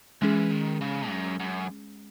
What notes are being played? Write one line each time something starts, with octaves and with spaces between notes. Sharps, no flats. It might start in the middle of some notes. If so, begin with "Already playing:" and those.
E3 G#3 C#4 G#4
D#3
C#3
F#2
F#2